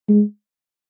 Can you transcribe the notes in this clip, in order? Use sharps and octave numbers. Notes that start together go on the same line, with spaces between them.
G#3